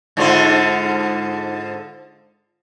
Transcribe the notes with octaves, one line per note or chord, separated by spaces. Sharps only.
G#2 D3 F4